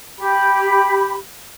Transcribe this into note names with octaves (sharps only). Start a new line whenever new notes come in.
G4 B5